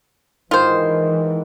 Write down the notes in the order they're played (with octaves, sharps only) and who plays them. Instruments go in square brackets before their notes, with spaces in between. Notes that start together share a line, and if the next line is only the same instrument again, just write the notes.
[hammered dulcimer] G#2 D#3 [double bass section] E3 [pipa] F4 C5